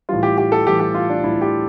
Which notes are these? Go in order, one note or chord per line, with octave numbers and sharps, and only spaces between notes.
A2 E3 G3 F4
G4
G4
A4
A2 E3 G3 G4
G4
F4
D4
A2 E3 G3 E4
G4